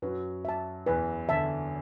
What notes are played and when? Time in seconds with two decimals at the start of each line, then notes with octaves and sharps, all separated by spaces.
0.02 F#2 F#3 B4
0.45 E5 A5
0.86 E2 E3 B4
1.29 D3 E5 A5